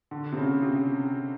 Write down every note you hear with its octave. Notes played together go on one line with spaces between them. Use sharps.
D3
C3
C#3
C3